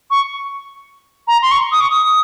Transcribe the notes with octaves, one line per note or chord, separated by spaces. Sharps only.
C#6
A#5
C6
C#6
D#6
C#6
D#6